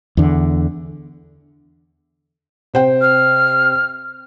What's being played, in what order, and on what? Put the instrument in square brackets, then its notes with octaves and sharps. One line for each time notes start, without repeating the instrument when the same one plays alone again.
[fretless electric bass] E2 D3
[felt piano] C3 C5 G5
[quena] F6